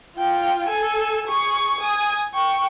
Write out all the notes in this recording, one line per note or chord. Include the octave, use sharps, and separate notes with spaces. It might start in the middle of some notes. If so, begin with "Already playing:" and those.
F4 G5
A4 G#5
G#4 C#6
G#5 D#6
G5 C#6